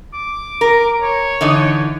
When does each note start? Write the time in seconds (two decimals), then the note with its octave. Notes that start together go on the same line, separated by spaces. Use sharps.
0.14 D6
0.61 A#4
1.01 C#5
1.41 D3 E3 D#4